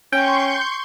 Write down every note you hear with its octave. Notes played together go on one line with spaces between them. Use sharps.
C#4 G5 C6 C#6 G6